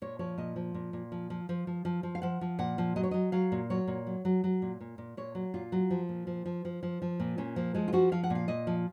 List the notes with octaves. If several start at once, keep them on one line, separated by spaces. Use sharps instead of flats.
A#2 C#5
F3 C#5
A#2 D#5
F3
A#2
A#2
F3
F3
F3
F3
F3
F3
F5
F3 F#5
F3
A#2 F#5
F3
F#3 D#5
C#5
F#3 D#5
F#3 F5
A#2
F#3 C#5
A#2
F#3
F#3
F#3
A#2
A#2
A#2
A#2 C#5
F#3
A#2 F4
F#3
F3
A#2
F3
F3
F3
F3
F3
A#2
A#2 C#4
F3 A#3
F3 G#3
F4
F3 F#4
F3 F5
F#5
A#2
F5
A#2 D#5
F3